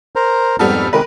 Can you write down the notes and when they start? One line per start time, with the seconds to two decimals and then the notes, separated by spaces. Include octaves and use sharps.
0.16 A#4 C5 A#5
0.59 F2 G#2 G3 B3 A4 F6
0.93 C3 D#3 G#3 A#4 B4